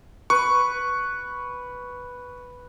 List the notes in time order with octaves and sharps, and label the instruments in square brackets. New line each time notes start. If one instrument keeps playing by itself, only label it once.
[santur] B4 [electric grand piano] C#6